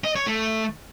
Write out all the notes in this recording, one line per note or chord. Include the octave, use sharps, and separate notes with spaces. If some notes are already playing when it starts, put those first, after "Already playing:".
D#5
C#5
A3